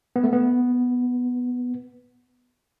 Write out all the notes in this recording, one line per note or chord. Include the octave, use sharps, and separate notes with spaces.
B3
A3
B3